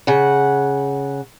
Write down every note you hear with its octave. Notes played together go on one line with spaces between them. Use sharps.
C#3 F#5